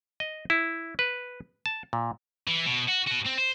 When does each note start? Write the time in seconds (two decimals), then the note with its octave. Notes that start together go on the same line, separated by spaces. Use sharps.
0.20 D#5
0.50 E4
0.99 B4
1.66 A5
1.93 A#2
2.47 E3
2.66 B2
2.88 F#4
3.07 F#4 B4
3.25 C4
3.38 C5